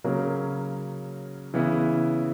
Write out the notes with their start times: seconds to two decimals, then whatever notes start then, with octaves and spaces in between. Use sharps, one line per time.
0.04 C#3 F#3 A#3 C#4
1.54 C#3 E3 B3 E4